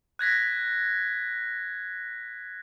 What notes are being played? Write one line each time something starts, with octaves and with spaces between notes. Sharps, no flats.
F#6 G#6 A#6 B6